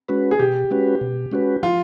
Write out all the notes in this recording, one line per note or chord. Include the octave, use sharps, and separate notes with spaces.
G#3 C#4 F#4 B4
G#4
B2 G4
G#3 C#4 F#4 B4
B2
G#3 C#4 F#4 B4
F3 F4